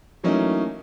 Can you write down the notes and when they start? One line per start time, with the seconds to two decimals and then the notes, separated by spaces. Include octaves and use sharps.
0.23 E3 F#3 A3 A#3 C#4 D#4